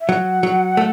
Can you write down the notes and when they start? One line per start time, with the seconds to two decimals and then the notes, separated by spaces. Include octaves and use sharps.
0.01 E5
0.09 F#3 F#5
0.43 F#3
0.77 A3